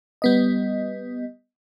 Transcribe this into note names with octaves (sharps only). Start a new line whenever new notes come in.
G3 B3 D#5